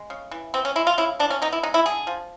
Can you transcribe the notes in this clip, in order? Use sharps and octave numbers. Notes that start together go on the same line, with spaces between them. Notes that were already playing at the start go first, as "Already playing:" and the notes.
Already playing: G#3
C#3
E3
B3 C4
C#4
G#3 E4
F4
C#3 E4
E3 D4
C#4
B3 D#4
E4
G#3 D#4
E4
D3 G#4
F3